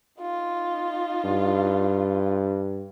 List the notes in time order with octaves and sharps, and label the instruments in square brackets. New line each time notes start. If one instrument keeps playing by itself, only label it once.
[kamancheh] D#4 F4
[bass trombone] G2